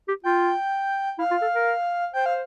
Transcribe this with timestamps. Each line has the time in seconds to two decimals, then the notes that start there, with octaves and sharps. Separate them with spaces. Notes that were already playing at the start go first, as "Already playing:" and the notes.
0.08 G4
0.24 F4 G5
1.18 E4 F5
1.31 F4
1.42 A4
1.55 A#4
2.14 C5 G5
2.26 F5